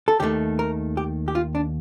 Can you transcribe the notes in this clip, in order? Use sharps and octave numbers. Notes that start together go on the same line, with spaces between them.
A4
D#2 D#3 A3 G4
A#4
G4
G4
F4
D4